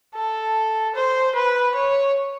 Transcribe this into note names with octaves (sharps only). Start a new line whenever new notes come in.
A4
C5
B4
C#5